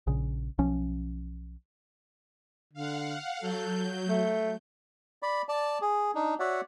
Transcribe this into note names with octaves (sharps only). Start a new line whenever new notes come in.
A#1 C#3
B1 F3 C#4
D3 F5 F#5
F#3 A4 G6
A3
D5 B5
D5 A5
G#4
D4 D#4
F#4 C#5 D5 E5 F#5